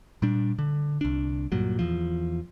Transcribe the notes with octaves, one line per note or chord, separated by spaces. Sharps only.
A#2 G3 D4
D3
C2 D4
G2 A#2 F#3
E2 F3